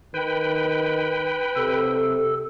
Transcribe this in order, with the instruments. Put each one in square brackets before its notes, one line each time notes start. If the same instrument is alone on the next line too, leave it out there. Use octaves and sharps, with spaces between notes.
[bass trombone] D#3 [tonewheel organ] B4 G5
[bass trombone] C3 [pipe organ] A4